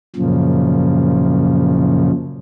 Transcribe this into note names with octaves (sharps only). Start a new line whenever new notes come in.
F#2 A#2 C#3 F3